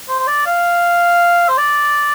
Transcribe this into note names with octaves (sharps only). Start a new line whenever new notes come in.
C5
C5
D5
F5
C5
D5